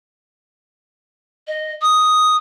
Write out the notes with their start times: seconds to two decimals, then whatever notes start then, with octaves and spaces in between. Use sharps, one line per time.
1.47 D#5
1.82 D#6